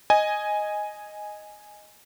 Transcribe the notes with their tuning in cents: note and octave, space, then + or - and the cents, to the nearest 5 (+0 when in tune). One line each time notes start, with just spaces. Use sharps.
D#5 +0 G#5 +0